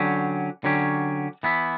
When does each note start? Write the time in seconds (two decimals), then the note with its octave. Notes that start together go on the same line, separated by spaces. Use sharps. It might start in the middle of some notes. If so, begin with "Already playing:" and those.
Already playing: D3 F#3 C#4 G4
0.64 D3 F#3 C#4 G4
1.43 E3 B3 E4